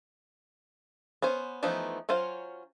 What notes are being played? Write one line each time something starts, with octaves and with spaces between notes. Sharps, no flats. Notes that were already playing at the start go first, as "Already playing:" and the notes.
B3 C#4 C5
E3 F3 A3 B3 D#4
F#3 C#4 F4 C5